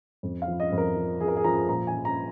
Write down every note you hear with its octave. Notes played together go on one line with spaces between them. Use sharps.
F2
F5
F3
D#5
F2
A#4
F3
F3 G#4
A#4
G#4
F3 A#5
A#2 A#5
G#5
F3
A#5